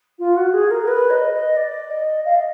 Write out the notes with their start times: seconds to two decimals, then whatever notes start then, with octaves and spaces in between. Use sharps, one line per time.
0.18 F4
0.36 F#4
0.53 G#4
0.70 A#4
0.87 B4
1.10 D#5
1.33 D#5
1.56 D5
1.90 D#5
2.24 F5
2.35 D#5